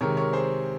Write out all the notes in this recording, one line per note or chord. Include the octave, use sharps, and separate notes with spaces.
C3 D#3 G#3 A#4 C#5
A#4 C#5
G#4 C5